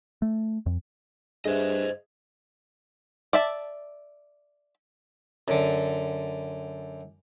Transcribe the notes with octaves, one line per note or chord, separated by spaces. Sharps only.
A3
F2
G2 G#4 C5 D#5 E5
D5 E5 A5
F#2 D3